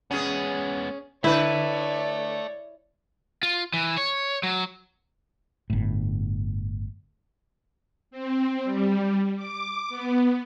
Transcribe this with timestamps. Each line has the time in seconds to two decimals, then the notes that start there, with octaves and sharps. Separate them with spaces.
0.11 G#3 B3 C#4 G#4
1.24 D3 E4 B4 C#5 D5 E5 A5
3.43 F4
3.74 E3
3.98 C#5
4.43 F#3
5.70 G1 A2
8.11 C4
8.64 G3
9.37 D6
9.89 B3